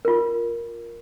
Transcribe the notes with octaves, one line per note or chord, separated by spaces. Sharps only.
F4 A#4